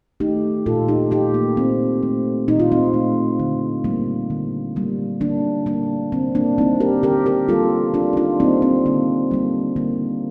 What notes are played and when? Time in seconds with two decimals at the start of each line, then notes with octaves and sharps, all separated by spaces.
0.20 A3 D#4 G4
0.66 A#2 F4 A4
0.88 D#4 G4
1.11 A3 D#4 G4
1.34 A#3
1.57 A#2 C4
2.03 A3
2.48 A#2 D#4
2.60 F4
2.72 C4 D#4
2.94 A3
3.40 D3
3.84 G3 A#3
4.30 D3
4.76 G3 A#3
5.21 D3 A#3 D4
5.66 G3 A#3 D4
6.12 D3 C4
6.35 A#3 D4
6.58 G3 A#3 C4 D#4
6.80 G4 A#4
7.03 D3 G4 A#4
7.26 G4 A#4
7.48 G3 A#3 F4 A4
7.94 D3 D4 F4
8.13 D#4
8.17 D4 F4
8.40 G3 A#3 C4 D#4
8.62 C4
8.86 D3 A#3
9.31 G3 A#3
9.76 D3 A#3